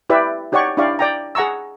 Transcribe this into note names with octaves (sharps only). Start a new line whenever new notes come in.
E4 G4 B4 D5 E5
D#4 G4 C#5 D5 F#5 C#6
D4 E4 G4 D5 F5 C#6
D5 G5 A#5
G#4 F#5 A#5 C#6 E6